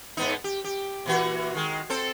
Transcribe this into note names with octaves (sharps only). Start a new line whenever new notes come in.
G#2 B3 D#4
G4
G4
A#2 E3 F#4
D#3 G#3
C4 A4 C5